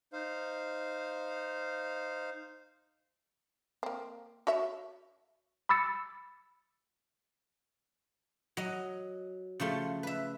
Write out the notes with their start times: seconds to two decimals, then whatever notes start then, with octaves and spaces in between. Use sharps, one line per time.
0.13 D#4 C5 F5
3.83 A#3 C4
4.47 F#4 C#5 E5
5.69 B5 D6 E6 A6 C#7
8.57 F#3 D#5
9.60 C#3 F3 A3 C6
10.03 B4 E5